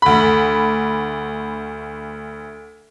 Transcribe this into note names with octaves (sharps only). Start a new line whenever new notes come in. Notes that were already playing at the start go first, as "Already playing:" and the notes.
D2 B5